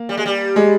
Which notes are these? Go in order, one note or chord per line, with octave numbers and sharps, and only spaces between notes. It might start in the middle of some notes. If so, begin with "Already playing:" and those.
Already playing: A#3
G3
G#3
G3
G#3